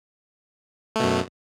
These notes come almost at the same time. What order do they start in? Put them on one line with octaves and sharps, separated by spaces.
A3 B2 F#2